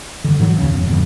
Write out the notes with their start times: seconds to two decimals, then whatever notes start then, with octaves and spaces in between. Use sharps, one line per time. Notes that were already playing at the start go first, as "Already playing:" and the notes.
0.24 G2 D3
0.40 G#2 E3 F#3
0.58 D#2 C#3
0.70 E1 F2
0.87 F2 G#2 B2 D3